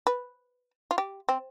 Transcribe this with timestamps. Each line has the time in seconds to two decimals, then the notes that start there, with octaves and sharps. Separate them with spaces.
0.07 B4
0.91 F4
0.98 G4
1.29 C4